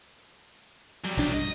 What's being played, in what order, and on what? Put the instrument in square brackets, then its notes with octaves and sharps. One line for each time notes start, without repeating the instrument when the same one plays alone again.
[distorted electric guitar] F#3 G3
[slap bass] B1 F3 D4
[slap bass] G2 [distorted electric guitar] D#5